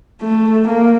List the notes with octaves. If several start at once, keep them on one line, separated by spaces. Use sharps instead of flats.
A3
A#3